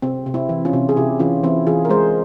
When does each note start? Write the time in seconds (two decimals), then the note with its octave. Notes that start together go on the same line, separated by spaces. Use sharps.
0.02 C3 C4
0.26 C3
0.34 C4 E4
0.49 E3
0.65 C#4 F4
0.73 C3
0.89 G#4
0.96 C3 E4 G4
1.19 E3 C#4 F4
1.43 E3 C4 E4
1.67 E3 F4 G#4
1.85 A#4
1.90 G#3 G#4 C5